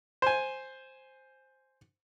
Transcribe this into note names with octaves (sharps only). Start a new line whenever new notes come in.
C5 G#5